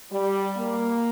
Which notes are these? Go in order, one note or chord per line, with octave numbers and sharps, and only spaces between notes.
G3
A#3